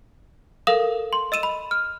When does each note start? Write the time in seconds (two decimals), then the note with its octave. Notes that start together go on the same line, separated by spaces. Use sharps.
0.67 A4 A#4 F5 D#6 E7
1.13 C6
1.32 D#5 E6 D#7 E7
1.43 B5
1.71 F6